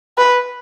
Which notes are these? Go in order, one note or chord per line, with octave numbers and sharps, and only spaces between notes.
B4